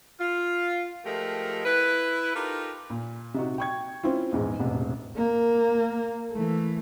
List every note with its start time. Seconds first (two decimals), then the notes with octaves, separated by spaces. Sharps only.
0.20 F4
1.05 F3 G#3 A3 G4 A#4
1.65 E4 B4
2.35 D#4 F4 G4 A4 A#4
2.90 A#2
3.34 C3 D#4 F#4
3.58 G5 C#6 G#6
4.03 C4 C#4 E4 F4
4.32 A#1 E2 G#2
4.59 E1 A1 C3
5.16 A#3
6.32 E3 A3